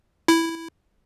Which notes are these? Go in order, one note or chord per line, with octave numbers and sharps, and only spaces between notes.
E4